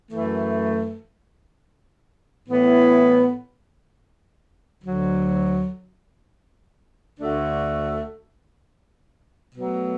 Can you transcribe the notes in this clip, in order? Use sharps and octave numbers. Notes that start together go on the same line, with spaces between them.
F#2 E3 A3
A2 E3 B3 E4
D2 D3 F#3
D2 D3 A3 D4 F#4
B2 F#3 A3